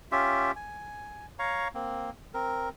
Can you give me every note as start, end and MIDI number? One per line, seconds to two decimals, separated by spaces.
0.12 0.52 61
0.12 0.52 65
0.12 0.52 67
0.12 0.52 76
0.56 1.26 80
1.39 1.68 73
1.39 1.68 77
1.39 1.68 82
1.39 1.68 85
1.75 2.10 58
1.75 2.10 60
2.34 2.69 60
2.34 2.69 70